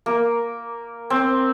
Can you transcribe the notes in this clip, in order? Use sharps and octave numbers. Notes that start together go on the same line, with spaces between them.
A#3
C4